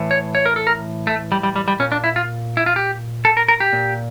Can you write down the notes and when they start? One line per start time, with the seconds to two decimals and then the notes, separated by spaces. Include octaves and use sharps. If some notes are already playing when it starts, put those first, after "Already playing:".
Already playing: A2 E3
0.11 C#5
0.35 C#5
0.46 A#4
0.56 A4
0.67 A#4
1.07 A3
1.32 G3
1.43 G3
1.56 G3
1.68 G3
1.80 A#2 C#4
1.92 D4
2.04 E4
2.16 F4
2.57 E4
2.66 F4
2.76 G4
3.25 A4
3.37 A#4
3.48 A#4
3.60 G4
3.73 A#2